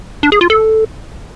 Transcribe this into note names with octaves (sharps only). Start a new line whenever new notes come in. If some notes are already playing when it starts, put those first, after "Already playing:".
D4
G#4
F4
A4